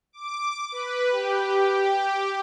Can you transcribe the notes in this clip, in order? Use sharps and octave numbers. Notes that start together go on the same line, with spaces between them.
D6
B4
G4
G4